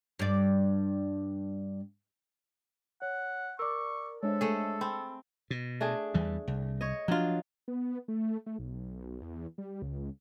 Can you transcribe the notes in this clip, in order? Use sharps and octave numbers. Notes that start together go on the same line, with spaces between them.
G2 D5
C#5 F#5
A#4 D5 C#6 D6 E6
G#3 D4 A4 C5 C#5 E5
A3 G#4
C4 B5
B2
A3 D4 G#4
E2 E3 G3
C2
C#5 D#5
F3 F#3 D4 F4
B3
A3
A3
B1
E2
G3
C#2